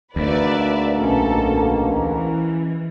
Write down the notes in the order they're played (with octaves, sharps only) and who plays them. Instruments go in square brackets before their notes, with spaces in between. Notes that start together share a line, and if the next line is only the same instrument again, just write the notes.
[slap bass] D2 [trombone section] G#2 B2 A#3 [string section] B4 D5 E5
[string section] B1 A#2 A4 [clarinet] C#4
[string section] E3